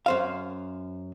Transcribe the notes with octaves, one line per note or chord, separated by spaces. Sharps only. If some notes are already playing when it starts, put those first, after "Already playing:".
F#2 C5 F5